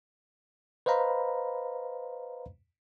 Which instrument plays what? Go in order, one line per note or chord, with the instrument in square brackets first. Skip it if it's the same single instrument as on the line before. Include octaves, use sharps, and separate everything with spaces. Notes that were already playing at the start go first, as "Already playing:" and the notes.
[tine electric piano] B4 C5 D#5 F5 A#5 B5